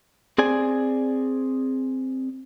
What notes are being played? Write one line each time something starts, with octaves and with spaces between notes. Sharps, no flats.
C4 G#4 D5 G#5